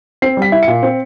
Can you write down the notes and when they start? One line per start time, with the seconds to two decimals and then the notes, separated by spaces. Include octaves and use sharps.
0.22 C4 C7
0.37 G3 B6
0.52 E4
0.63 A#2 C#7
0.83 C4